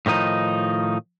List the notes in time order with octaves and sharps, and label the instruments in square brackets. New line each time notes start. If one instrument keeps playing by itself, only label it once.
[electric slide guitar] A2 D#3 F3 D#4